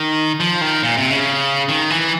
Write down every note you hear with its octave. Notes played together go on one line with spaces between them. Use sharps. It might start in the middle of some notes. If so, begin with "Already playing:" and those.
Already playing: D#3
F3
D#3
A#2
C3
C#3
D#3
E3